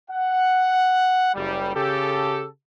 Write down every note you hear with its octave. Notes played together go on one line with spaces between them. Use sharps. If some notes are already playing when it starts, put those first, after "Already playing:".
F#5
F#1 G3
C#3 G4 A4